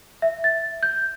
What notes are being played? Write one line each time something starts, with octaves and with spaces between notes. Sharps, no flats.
E5
A6
G6